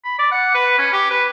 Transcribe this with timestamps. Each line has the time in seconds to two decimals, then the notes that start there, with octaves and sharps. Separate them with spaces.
0.05 B5
0.19 D5
0.32 F#5
0.55 B4
0.78 C#4
0.92 G4
1.11 B4